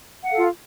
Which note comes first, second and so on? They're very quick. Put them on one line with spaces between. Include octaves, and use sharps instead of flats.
F#5 F5 A4 F4